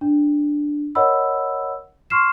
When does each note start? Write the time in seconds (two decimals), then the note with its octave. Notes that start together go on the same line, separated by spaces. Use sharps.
0.01 D4
0.95 A#4 C#5 D#5 F#5 B5 E6
2.10 C6 C#6 F6 C7 E7